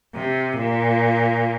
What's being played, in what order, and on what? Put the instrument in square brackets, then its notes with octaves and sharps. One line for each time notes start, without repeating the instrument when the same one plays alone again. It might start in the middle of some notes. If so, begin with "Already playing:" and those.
[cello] C3
A#2